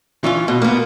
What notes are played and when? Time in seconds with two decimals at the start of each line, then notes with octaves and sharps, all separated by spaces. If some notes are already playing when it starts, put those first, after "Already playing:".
0.24 E3 C#4 F4
0.48 B2
0.62 A#3 B3